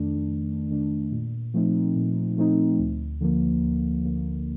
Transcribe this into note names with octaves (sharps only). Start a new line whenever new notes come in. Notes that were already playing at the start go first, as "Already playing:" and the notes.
Already playing: F2 D#3 A3 D4
F2
D#3 A3 D4
A#2
F3 A3 C4 D#4
A#2
F3 A3 C4 D#4
D2
D3 F3 A#3
D2
D3 F3 A#3